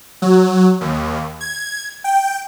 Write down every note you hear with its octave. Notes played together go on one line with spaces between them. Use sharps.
F#3
D#2
G#6
G5